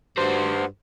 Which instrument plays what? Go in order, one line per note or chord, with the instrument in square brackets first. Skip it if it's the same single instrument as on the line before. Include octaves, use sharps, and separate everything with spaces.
[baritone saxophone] G2 [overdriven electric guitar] F#4 C5